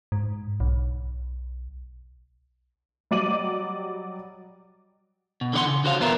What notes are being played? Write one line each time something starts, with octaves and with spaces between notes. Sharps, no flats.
G#2
B1
F#3 G3 D5 D#5 D#7 F#7
B2
D3 E3 D5 F#5 C6
C#3
D3 F#4 C5 C#5 F5
E2 A#2 B3 F4 A#4 E5